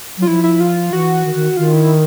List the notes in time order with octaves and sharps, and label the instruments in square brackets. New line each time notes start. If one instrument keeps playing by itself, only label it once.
[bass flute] F#3 [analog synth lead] F4
[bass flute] F3 [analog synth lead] E4
[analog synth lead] E4
F4
[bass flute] E3 [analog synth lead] F#4
[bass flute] D#3
D#3
[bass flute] D#3 [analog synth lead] F4
[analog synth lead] E4